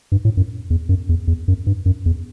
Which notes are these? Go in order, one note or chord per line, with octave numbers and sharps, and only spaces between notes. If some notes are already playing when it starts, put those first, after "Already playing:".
G2
A2
F#2
E2
F#2
E2
E2
F#2
G2
F#2
E2